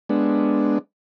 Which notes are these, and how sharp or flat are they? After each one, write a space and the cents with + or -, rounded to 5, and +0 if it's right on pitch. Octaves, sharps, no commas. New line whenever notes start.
G#3 +0 B3 +0 D4 +0